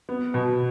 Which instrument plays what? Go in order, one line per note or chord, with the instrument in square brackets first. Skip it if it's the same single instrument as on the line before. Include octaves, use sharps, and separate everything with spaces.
[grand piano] B3
B2